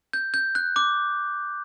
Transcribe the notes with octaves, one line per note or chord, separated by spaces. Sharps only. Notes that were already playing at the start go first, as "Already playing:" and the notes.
G6
G6
F#6
D6